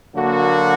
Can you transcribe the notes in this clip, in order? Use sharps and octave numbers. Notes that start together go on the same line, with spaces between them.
D3 F#3 A#3 F#4